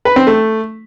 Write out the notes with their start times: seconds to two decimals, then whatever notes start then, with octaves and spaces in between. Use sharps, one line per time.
0.05 B4
0.16 C4
0.27 A3